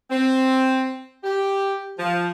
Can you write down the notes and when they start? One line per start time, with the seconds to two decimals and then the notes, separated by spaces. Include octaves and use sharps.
0.10 C4
1.24 G4
1.98 F3